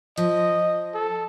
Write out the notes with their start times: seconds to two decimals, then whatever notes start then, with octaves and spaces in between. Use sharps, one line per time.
0.17 F3 D#5
0.94 A4